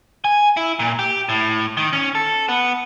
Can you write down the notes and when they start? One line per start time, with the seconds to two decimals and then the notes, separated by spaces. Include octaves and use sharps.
0.25 G#5
0.57 E4
0.79 A#2
0.99 G4
1.29 A2
1.77 D#3
1.93 C#4
2.15 A4
2.48 B3